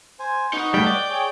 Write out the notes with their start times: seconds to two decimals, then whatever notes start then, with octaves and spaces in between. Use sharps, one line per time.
0.19 C5 G#5
0.53 D#4 F#4 B4 D#5
0.74 G3 A3 G5
0.87 D5
1.09 G#4 C#5